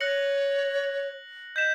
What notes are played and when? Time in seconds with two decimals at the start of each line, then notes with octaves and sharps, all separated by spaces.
0.01 C#5 F#6 A#6 C#7 F#7
1.56 D#5 G6 B6 E7